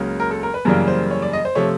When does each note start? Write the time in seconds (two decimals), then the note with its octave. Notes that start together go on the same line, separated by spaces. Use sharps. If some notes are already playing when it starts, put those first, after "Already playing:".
Already playing: C#2 C#3 F#3 A#3
0.20 A#4
0.31 A4
0.43 A#4
0.54 B4
0.65 F#2 C#3 E3 G3 A#3 A#4
0.88 C5
1.11 C#5
1.22 D5
1.33 D#5
1.45 C5
1.55 C3 F3 A3 C#5